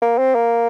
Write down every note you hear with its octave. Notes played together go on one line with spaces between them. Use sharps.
A#3
C4
A#3